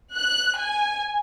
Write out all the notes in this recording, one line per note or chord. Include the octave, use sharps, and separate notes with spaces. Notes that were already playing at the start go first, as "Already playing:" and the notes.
F#6
G#5